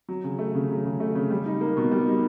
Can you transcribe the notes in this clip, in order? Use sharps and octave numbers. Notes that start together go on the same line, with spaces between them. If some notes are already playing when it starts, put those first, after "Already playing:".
F#3
C#3
A3
C#3
F#3
C#3
A3
C#3
G3
D#4
A#3
B2
G3
D#4